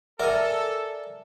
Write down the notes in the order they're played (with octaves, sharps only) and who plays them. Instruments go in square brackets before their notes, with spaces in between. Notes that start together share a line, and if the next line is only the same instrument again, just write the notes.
[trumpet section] A4 [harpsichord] A#4 G#5 [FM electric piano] D5 [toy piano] E5